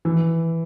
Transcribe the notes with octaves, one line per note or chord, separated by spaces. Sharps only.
E3